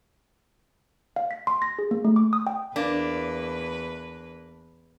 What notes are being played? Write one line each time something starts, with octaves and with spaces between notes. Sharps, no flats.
F5
B6
C6
A#6
G#4
A#3
A3
D6
D#6
G5
E2 A#3 D4 B4